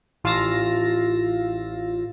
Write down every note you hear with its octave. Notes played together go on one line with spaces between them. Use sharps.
A1 F4 F5 E6 A6 A#6